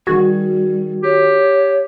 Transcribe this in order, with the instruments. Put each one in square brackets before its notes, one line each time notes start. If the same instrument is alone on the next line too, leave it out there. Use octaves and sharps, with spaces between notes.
[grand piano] D#3 G#4 G#6 [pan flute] G3 [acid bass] F#4
[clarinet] G4 [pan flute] C#5